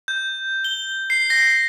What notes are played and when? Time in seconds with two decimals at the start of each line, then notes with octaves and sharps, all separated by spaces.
0.08 G6
0.64 G7
1.10 C7
1.30 A#6